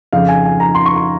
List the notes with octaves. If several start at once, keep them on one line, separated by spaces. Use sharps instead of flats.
F2 C#3 F3 F5
G#5
G#5
A#5
C6
C#6
C6